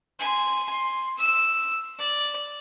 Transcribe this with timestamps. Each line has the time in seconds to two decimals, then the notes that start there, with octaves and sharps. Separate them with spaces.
0.19 G#5 C6
0.69 C6
1.18 E6
1.98 D5